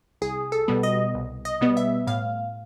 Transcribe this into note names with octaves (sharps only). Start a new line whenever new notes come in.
C2 G#4
A4
B2 G3 B3
D#5
C2
D#5
B2 G3 B3
E5
A2 F5